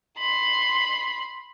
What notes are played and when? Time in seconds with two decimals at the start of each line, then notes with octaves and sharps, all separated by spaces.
0.18 B5 C6